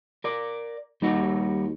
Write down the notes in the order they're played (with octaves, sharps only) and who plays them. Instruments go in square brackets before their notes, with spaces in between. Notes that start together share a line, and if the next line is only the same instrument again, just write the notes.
[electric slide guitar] A#4 D5
[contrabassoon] D#2 [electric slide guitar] G3 D#4 F#4